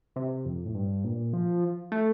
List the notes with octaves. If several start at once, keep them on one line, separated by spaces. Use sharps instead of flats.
C3
F2
A2
G2
A#2
F3
A3